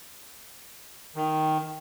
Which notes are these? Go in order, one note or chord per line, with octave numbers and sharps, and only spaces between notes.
D#3